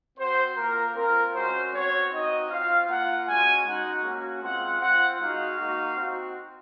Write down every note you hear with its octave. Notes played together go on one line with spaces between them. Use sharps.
C4 F#4 C5
A#3 F4 A#4
C4 F4 A#4
G#3 C#4 F#4 C5
C4 F#4 C#5
C4 D#4 F#4 D#5
C4 F4 F5
A#3 F4 F#5
G#3 C#4 F#4 G#5
G#3 D#4 F#4 F#5
A#3 C#4 F#4
G#3 C4 F4 F#5
C4 F4 F#5
G#3 D#4 F#4 F5
A#3 D#4 F#4
C4 D#4 F#4